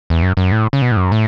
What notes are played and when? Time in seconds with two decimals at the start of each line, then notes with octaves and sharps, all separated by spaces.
0.10 E2
0.22 F#2
0.37 F#2
0.52 A2
0.73 C#3
0.82 B2
0.92 A2
0.97 F#2
1.12 A2